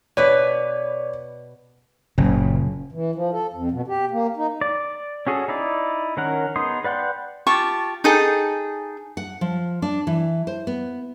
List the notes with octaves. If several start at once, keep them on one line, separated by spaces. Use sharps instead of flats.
B2 B4 C#5 D5
F#1 A#2 C#3
E3
F3
A4
F2
B2
G4
A#3
D#4
D5
C#4 F#4 G#4 A4
D#4 E4 D5
D#3 C#4 A#4 F#5
B3 D#4 G#4 C6 D#6
B4 D5 F#5 G5 C6
F4 G4 A5 C#6
D#4 G#4 A4 G5
F#5
F3
D4
E3
C5
B3